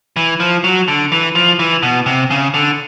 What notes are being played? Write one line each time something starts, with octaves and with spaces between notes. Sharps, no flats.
E3
F3
F#3
D3
E3
F3
E3
B2
C3
C#3
D3